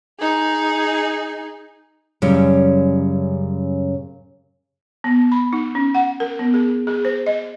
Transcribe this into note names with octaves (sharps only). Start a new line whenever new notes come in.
D#4 G#4
F#2 C#3 G3
B3
B5
D#4
C#4
F#5
A#4
B3
G#4
G#4
C5
D#5